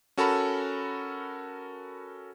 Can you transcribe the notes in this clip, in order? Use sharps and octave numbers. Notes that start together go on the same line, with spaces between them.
C#4 F#4 A4 A#4 A5 B5